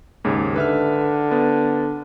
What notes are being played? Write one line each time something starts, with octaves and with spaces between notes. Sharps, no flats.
D#2 G#2 C#3
D3 B4 E5 F6
B3